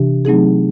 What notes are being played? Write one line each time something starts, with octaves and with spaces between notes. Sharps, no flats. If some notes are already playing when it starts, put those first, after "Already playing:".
Already playing: C3 E3 D4 G4
F#3 A3 C4 D#4 G#4